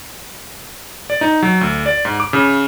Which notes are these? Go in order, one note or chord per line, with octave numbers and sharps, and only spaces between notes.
D5
D#4
F#3
D2
D5
G#2
D6
C#3